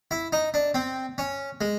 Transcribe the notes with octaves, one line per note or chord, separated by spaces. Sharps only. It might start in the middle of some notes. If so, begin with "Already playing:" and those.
E4
D#4
D4
C4
C#4
G#3